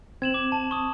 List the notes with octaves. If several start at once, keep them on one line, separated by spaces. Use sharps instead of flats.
C4 G#6 E7 F#7
D6
A5
C#6 D#6